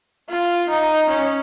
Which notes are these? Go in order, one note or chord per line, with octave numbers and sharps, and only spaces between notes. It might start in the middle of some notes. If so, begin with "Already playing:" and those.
F4
D#4
C#4